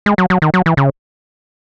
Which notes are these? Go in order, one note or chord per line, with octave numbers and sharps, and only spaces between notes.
G#3
F#3
F#3
D#3
F#3
E3
C#3